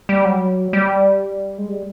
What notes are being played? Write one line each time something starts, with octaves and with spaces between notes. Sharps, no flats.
G3
F#3
G3
G#3
G3